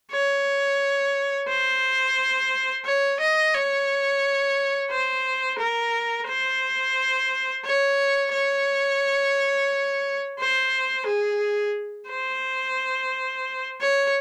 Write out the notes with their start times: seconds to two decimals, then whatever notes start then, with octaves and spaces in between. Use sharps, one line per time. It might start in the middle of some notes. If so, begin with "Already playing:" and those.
0.12 C#5
1.49 C5
2.85 C#5
3.20 D#5
3.54 C#5
4.91 C5
5.59 A#4
6.28 C5
7.65 C#5
8.33 C#5
10.39 C5
11.07 G#4
12.10 C5
13.81 C#5